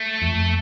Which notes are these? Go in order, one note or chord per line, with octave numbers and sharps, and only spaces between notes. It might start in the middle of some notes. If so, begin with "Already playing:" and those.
Already playing: A3
F2